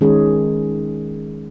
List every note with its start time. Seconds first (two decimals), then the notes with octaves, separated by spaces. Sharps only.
0.01 D#3 G#3 C#4 G#4